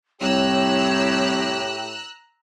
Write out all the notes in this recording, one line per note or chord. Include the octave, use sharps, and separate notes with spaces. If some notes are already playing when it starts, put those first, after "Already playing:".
C2 A2 G4 C#5 A#5 E6 F#6